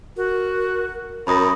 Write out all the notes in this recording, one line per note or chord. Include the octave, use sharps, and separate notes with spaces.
F#4 A#4
F#2 A#4 A#5 B5 D#6 A#6